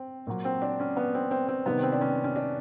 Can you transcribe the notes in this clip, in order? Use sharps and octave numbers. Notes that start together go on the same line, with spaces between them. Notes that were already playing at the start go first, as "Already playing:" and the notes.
Already playing: C4
A#2 F#3
C4
D4
C#4
B3
C4
C4
C4
C3 D#3 G3 B3
C4
D4
C#4
C#4
D4